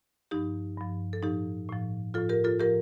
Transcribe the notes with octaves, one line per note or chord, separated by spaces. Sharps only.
G2 F3 D#4 G4
G2 F3
A4
A2 F3 D#4 G4
A2 F3
A2 F3 F4 A4
G4 A#4
F4 A4
A2 F3 G4 A#4